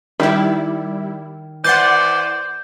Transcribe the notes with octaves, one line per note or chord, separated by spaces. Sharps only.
D#3 G3 E4
E3 C5 D5 F#5 C6 G6 A6